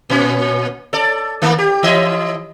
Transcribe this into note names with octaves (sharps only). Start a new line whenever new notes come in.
A#2 C#4
A4 D5
D#3 A3 A#3
G4
E3 D#5 E5